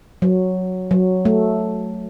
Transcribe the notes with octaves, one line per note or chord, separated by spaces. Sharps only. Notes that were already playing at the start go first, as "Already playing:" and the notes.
F#3
F#3
A3